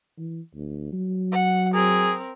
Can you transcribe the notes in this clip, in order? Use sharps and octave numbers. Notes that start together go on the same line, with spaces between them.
E3
D2
F#3
F#5
C4 G#4 A#4